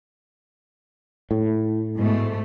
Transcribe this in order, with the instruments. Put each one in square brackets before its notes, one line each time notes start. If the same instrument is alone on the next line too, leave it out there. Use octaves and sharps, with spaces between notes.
[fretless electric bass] A2
[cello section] G#2 B2 A3